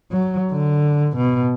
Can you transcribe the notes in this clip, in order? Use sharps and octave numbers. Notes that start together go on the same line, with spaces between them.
F#3
D3
B2